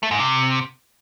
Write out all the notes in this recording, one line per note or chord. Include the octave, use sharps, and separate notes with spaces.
A3
G#2
C3